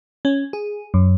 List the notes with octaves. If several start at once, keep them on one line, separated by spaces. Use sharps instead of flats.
C#4
G#4
F#2